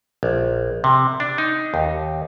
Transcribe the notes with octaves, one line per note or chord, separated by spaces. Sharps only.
A#1
C3
D4
D#4
D#2